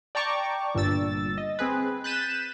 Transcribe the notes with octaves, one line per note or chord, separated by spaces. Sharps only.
D5 G5 A5 A#5 C#6 D6
G1 G2 A#2 E6 A6
D#5
C4 G#4 B4
F#6 G6 A6 B6 D#7 E7